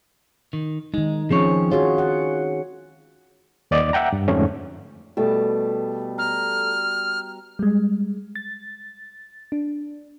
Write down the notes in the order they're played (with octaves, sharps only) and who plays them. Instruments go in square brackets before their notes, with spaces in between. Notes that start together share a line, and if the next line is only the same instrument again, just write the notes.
[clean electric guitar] D#3
[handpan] D#3 D#4 [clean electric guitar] G#3
[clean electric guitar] F3 C#5 [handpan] C4 C#4 G#4
[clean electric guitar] F4 [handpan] F#4 G#4 C#5
[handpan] F#5
[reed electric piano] D#2 D5 D#5 D6
E5 F#5 G5 A#5
G2
F2 G#2 D3 A3 C#4
[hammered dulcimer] B2 G3 A5 [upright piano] A3
[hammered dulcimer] A#5 [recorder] F6
[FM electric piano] G3 G#3
A6
D4